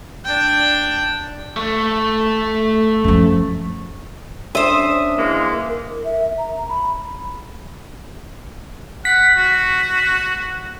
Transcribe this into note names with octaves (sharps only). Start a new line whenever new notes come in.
D4 G5
A3
F#2 F3
C#4 D4 C5 E5 D#6
E3 G#3 A#3
A#4
E5
A#5
B5
F#5 B6
F#4